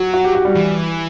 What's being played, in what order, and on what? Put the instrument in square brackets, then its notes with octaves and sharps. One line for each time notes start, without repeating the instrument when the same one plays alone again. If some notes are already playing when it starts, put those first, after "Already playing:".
Already playing: [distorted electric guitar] F#3 [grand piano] F#4
[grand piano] F#4
G4
F#4
G3
[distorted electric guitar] E3